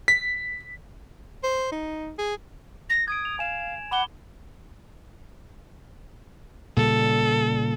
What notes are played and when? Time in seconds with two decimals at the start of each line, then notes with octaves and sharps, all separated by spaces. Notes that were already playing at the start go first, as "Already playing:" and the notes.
0.08 B6
1.43 C5
1.72 D#4
2.18 G#4
2.89 A#6
3.08 D#6 G#6 D7
3.25 F7
3.39 F5 G#5 E7
3.91 F#5 B5 D6 G7
6.77 A#2 C#3 G3 A4